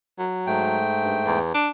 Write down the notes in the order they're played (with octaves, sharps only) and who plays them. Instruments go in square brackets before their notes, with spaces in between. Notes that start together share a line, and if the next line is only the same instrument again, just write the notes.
[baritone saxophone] F#3
[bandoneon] G#2 A3 G5
[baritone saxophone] G2
E2
D4